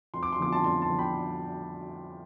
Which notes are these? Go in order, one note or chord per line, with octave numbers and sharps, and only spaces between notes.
F2 C6
D6
C6
D3 F3 B3 D6
A5 C6
F2 A5 C6
A5 C6
D3 F3 B3
G5 B5